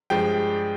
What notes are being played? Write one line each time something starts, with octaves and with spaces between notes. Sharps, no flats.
G2 F3 G#3 G5